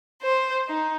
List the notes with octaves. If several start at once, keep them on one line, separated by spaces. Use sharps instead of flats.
C5
D#4